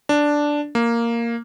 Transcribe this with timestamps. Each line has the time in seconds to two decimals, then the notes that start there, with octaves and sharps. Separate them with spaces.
0.09 D4
0.75 A#3